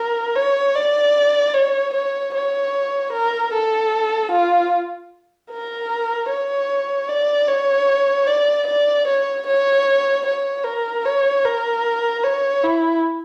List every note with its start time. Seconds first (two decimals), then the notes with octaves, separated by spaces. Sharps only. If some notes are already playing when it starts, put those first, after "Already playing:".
Already playing: A#4
0.35 C#5
0.76 D5
1.54 C#5
1.94 C#5
2.34 C#5
3.13 A#4
3.53 A4
4.32 F4
5.51 A#4
6.30 C#5
7.09 D5
7.48 C#5
8.27 D5
8.67 D5
9.07 C#5
9.47 C#5
10.26 C#5
10.65 A#4
11.05 C#5
11.44 A#4
12.24 C#5
12.64 E4